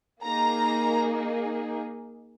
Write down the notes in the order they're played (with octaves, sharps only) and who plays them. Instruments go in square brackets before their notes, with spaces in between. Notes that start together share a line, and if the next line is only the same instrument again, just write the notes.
[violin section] A#3 D#4 G#4 A#5